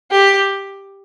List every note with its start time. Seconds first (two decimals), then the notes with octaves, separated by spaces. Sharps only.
0.11 G4